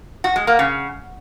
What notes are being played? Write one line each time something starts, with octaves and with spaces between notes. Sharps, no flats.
F#4
G#3
A#3
C#3